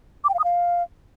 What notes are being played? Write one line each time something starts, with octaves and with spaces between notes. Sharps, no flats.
D6
G5
F5
D#6
F5